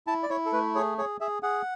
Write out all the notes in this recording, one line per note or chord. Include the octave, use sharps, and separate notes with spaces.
E4 A5
D5
E4 C#5
A4
A3 B4
G#4 C#5
G#4 C#5
G#4 E5
G#4 F#5